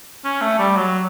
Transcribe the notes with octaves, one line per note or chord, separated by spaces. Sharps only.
C#4
A3
G3
F#3